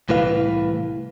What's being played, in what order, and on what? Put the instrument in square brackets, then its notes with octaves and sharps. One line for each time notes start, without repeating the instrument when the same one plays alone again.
[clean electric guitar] C2 A2 E3 B4 F5